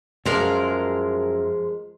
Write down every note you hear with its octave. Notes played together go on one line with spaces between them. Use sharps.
F#2 F3 G#3 A#4